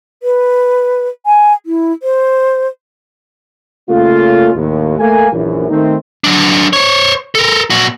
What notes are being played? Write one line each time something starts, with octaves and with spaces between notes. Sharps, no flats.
B4
G#5
E4
C5
C#3 A3 A#3 C#4 F4
D#2 A2
A3 A#3 G#5
A#1 F#2 E3
D#3 A3 C4 D#4
F#3 D4
C5 C#5
A4 A#4
A#2 F#4